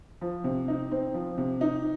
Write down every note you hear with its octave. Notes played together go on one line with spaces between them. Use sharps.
F3
C3
D#4
C4
F3
C3
D#4